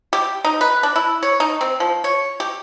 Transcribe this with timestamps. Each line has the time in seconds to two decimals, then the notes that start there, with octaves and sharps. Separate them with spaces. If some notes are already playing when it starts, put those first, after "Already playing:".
0.13 G4
0.45 D#4
0.61 B4
0.83 D4
0.96 E4
1.23 C#5
1.40 D#4
1.61 C4
1.80 F3
2.04 C#5
2.40 G4